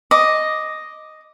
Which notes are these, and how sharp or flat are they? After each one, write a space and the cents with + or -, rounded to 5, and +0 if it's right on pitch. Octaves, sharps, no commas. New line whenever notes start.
D#5 +0 D6 +0